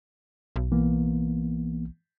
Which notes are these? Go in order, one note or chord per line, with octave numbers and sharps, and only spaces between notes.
B1
E3 A#3 B3